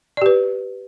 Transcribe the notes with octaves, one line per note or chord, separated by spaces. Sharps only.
G4 B4 D5